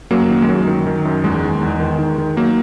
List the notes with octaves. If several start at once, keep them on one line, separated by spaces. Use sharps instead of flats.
F#2 F#3 A#3
D#3
G#3
F#2 F#3
D#3
D#3
F#2
E2 G#3
D#3
E2
D#3
D#3
D#3
F#3 A#3